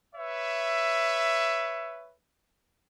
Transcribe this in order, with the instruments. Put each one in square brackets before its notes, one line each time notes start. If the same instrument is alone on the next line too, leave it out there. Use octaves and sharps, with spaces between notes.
[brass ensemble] B4 C#5 E5